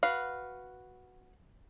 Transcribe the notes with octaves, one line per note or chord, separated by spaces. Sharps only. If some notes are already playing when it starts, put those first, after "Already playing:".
F#4 B4 F5